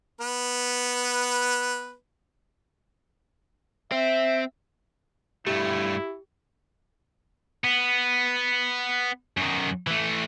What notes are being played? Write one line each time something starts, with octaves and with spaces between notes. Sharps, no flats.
B3 B4
C4 E5
G2 A3 E4 G4
B3
F#2 D#3
E3 A3